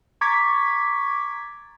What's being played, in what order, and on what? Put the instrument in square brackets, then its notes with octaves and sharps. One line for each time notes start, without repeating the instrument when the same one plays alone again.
[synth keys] A#5 C#6 D6 G#6 A6 B6